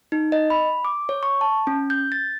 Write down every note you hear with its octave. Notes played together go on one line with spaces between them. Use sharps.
D#4
D#5
B5
D6
C#5
C#6
A5
C#4
G6
A6